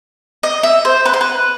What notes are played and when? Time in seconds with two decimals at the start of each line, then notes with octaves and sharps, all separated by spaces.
0.43 D#5
0.63 E5
0.85 C5
1.06 B4
1.14 C5
1.21 B4